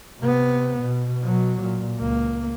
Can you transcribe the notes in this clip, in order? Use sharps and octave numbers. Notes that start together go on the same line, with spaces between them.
C3 B3
B2
B2 F#3
A#2
C#2 A#3